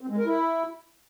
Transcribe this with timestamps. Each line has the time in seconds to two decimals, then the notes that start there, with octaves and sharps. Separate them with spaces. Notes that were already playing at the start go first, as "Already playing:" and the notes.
0.01 C4
0.09 G#3
0.18 A#4
0.26 E4